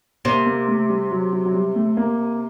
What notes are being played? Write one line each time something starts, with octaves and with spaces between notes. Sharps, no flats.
C3 A#3
A#3
A3
G3
F#3
F#3
F#3
G3
A3
A#3